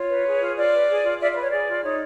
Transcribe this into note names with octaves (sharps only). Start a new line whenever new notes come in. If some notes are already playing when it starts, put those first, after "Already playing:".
Already playing: F4 C#5
B4
G#4
F4
F4 D5
B4
G#4
F4
F4 D5 E5
D5
B4
C#5
G#4 D5
F4
D#4 C#5